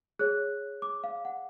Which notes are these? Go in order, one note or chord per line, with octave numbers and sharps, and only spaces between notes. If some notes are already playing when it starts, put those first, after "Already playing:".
G#4 C#5 F#6
D6
F5
F#5